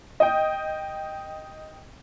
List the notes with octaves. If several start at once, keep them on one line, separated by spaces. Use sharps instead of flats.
D#5 G5